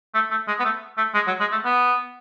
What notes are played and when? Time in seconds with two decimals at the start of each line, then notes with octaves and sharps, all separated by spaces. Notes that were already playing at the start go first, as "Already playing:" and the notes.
0.14 A3
0.31 A3
0.48 G#3
0.60 B3
0.65 A3
0.98 A3
1.15 G#3
1.27 F#3
1.40 G#3
1.52 A3
1.65 B3